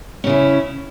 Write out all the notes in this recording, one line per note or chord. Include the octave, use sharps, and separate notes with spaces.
C#3 C#4 E4